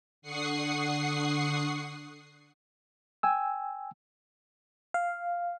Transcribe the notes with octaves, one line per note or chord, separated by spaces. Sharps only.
D3 F#5 C#6 D#6 C7
G5 G#5 E6
F5